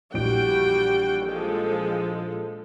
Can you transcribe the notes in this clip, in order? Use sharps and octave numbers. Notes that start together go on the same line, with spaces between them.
A#1 E3 G3 F#4 G5 D7
F3 G#3 A4